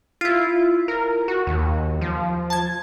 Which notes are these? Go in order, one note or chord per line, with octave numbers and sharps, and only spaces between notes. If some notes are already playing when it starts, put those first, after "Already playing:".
E4 F4
A#4
F#4
D#2
F3
A5 G#6